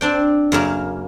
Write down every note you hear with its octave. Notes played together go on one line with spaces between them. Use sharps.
C4 D4 G5
F#2 C#3 A#3